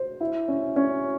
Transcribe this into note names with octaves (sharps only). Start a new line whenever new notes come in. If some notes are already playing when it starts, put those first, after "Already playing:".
Already playing: C5
E4
C#4
C#4